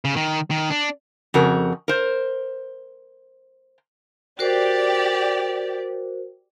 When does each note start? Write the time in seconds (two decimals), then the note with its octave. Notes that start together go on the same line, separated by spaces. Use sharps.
0.05 C#3
0.16 D#3
0.51 D#3
0.70 D4
1.34 F2 C#3 F#4 A#4
1.88 A#4 C5
4.39 F#4 G4 A#4 C5 D5